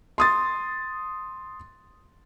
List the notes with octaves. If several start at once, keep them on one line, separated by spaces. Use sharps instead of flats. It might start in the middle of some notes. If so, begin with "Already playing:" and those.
C6 D#6 A6